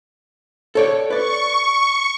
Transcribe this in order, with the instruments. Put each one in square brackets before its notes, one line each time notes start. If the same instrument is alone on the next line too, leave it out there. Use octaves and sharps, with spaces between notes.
[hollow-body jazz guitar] A4 C#5 D5
[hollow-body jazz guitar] B4 D5 [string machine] C#6